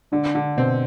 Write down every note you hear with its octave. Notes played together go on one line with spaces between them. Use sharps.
D3 D4
D3
B2 C4